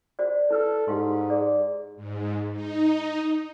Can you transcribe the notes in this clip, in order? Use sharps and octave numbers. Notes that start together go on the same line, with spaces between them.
F#4 C5 D5
E4 A4 B4 E6
G#2 G4 F5 C6
G#4 D5
G#2
D#4